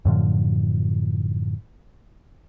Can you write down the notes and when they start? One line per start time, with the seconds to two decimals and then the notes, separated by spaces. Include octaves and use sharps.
0.05 F#2 A2 D3 F3